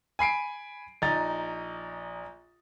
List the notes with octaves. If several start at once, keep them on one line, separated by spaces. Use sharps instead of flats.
G#5 B5 C7 D7
A#1 D#4 A#5 A6